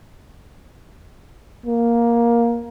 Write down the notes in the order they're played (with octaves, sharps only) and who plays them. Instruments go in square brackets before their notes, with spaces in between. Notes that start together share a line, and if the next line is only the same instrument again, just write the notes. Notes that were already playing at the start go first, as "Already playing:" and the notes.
[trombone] A#3